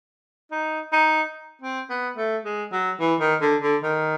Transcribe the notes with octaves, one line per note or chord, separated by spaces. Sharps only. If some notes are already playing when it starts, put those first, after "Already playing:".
D#4
D#4
C4
B3
A3
G#3
F#3
E3
D#3
D3
D3
D#3